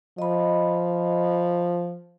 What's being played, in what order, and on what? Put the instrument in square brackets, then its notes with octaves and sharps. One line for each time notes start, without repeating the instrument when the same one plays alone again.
[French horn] F3 [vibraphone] D#5 B5